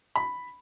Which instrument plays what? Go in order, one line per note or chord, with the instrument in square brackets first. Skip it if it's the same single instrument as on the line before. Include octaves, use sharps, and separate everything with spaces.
[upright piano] B5